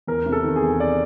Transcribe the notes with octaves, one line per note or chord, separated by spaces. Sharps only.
E2 A#4
C3
A4
D#3
G#4
E2
D5